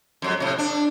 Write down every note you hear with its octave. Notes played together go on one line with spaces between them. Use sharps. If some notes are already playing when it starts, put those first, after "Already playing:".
F2 F#3 G#3
A2 C3
D4